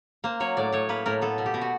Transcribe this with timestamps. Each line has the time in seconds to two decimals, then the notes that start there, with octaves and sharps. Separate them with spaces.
0.24 A#3 C5
0.40 F#3 C#5
0.57 A2 D5
0.72 A2 C#5
0.89 A#3 B4
1.06 A2 A#4
1.22 B3 A4
1.38 B2
1.46 G4
1.54 B2
1.61 F#4